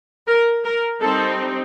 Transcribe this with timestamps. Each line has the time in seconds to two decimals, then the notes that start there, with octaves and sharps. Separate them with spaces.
0.27 A#4
0.64 A#4
1.01 G3 C4 D#4 A4